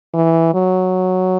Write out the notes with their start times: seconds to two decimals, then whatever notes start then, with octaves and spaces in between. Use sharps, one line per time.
0.14 E3
0.54 F#3